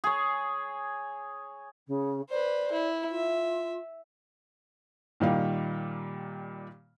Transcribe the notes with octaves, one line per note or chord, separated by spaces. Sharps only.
G#4 C#5
C#3
B4 C5 D5
E4
F4 E5
A#2 D#3 G3 F5